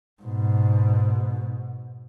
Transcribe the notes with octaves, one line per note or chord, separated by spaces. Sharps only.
G#2 B2